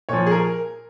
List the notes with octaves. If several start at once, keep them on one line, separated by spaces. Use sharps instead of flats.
A#2 F3 C#5
G#4
A#4